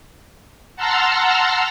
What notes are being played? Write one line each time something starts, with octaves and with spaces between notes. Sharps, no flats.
F#5 A5 A#5 C6 E6 F6